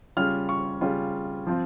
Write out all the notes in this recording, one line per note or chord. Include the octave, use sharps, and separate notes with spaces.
C#3 G3 C#4 F4 F6
C#6
C#3 G3 C#4 F4
F3 C4 F4